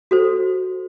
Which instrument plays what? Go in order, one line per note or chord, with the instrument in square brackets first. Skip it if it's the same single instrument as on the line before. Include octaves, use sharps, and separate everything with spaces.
[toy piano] F#4 A4 C5